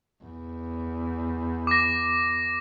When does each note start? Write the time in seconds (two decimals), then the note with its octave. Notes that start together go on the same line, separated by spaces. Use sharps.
0.24 E2
1.67 D6 A#6